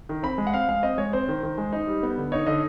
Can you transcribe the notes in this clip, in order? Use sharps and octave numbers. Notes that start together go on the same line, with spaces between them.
D#3
C4 B5
G#3
F#5
C4 F5
G#3 F5
C4 D#5
G#3 C#5
C4 C5
D#3
D#3
G#3
D#4
G3
B3
D3
D#4 C#5
D3 D#5